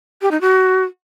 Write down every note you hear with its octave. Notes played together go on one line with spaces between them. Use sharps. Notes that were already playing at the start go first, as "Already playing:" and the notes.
G4
D#4
F#4